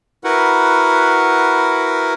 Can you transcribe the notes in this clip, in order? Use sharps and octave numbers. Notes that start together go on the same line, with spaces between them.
E4 F#4 A#4 B4 F#5